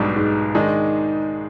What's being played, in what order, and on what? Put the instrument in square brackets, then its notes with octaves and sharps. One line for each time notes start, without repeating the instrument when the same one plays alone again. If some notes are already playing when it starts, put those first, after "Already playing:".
Already playing: [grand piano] B1 B2 G3 D4 [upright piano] G#2
[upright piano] G#2
[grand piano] D#3 G#3 D4